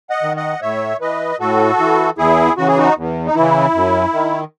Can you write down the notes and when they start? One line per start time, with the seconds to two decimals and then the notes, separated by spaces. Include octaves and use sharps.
0.10 D#5 F#5
0.23 D#3
0.37 D#5 F#5
0.62 A2 C#5 E5
1.01 E3 B4 D#5
1.40 A2 F#4 A4
1.79 E3
2.18 E2 E4 G#4
2.57 C#3 E3 F#4
2.68 G#4
2.77 D#4 F#4
2.97 E2
3.27 D#4
3.35 C#3 E3 E4
3.74 F#2
4.13 D#3